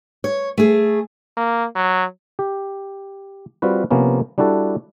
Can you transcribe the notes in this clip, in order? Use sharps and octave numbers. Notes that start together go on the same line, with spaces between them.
C#5
A3 G#4
A#3
F#3
G4
G3 C4 F4 F#4 B4
C3 F3 A#3 B3 C#4
G3 D4 E4 F#4 A4